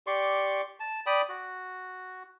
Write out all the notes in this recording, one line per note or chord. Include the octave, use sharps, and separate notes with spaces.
G4 D5 C6 C#6
A5
D5 G5 B5 D#6
F#4